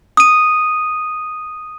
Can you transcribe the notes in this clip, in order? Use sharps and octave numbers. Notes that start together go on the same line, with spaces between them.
D#6 D#7